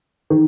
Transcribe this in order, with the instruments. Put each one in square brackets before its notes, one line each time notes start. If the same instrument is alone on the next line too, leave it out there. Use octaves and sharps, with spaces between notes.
[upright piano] D#3